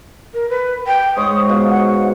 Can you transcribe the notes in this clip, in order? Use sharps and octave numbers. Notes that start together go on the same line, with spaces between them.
A#4
B4
G5
G#2 C#5 D#6
B2 F5
F#5